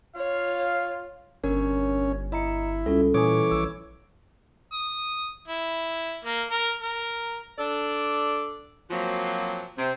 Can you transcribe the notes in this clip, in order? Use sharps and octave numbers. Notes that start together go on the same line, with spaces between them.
F4 C#5 F5
G1 C#4 D4 A#4 C#5
E4 D#5 A#5 C#7
C#2 G3 C#4 F4 A4
A#2 E3 C#5 G#5 D6 D#6
A#1 E6
D#6
E4
A#3
A#4
A#4
D4 A4 D5
F3 F#3 A#3 C4 F#4
C3 C4